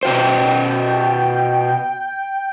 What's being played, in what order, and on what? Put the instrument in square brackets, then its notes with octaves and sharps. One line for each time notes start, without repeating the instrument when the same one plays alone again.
[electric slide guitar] B2 F#4 C5 [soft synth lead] G5